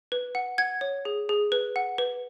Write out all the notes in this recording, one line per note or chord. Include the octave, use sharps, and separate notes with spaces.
B4
F#5
F#5 G#6
C#5
G#4
G#4
B4
F#5
B4